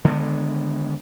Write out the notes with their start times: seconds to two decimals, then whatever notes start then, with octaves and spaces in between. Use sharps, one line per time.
0.04 D3 D#3 G#3 B3